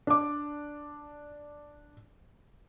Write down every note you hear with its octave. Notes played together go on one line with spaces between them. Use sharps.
D4 D6